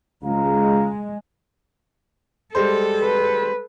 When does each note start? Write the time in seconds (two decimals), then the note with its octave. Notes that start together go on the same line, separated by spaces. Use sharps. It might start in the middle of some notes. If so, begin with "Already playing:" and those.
0.23 C#2 G#3 F5 A#5
2.55 G3 G#3 A4 C5
3.03 B4